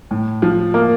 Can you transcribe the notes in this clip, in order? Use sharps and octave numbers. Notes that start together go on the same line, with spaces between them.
A2
F3
A#3